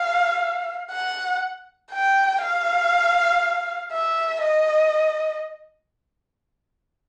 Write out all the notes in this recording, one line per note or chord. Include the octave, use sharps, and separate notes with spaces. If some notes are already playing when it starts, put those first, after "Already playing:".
Already playing: F5
F#5
G5
F5
E5
D#5